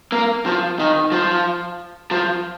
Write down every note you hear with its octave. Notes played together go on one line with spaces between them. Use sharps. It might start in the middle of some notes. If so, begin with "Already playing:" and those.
A#3
F3
D#3
F3
F3